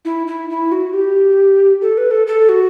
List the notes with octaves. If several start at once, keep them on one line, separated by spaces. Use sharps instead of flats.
E4
E4
E4
F#4
G4
A4
B4
A4
A4
F#4